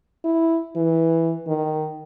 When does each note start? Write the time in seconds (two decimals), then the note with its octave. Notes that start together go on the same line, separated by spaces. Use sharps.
0.24 E4
0.76 E3
1.48 D#3